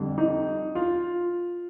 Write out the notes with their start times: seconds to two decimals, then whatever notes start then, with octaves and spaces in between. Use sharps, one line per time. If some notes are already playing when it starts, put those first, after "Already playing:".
Already playing: F2 D3 G3
0.18 D#4
0.75 F4